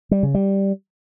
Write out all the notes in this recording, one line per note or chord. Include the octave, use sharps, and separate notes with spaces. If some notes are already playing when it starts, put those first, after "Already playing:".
G3
C#3
G3